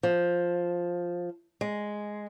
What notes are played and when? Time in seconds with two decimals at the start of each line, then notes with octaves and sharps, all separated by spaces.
0.03 F3
1.61 G#3